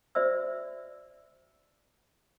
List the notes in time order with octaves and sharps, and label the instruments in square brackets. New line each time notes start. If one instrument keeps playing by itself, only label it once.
[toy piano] F#4 C5 D5 E5 E6